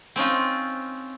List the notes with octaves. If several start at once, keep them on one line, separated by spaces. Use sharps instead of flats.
C4 C#4 D#4 F4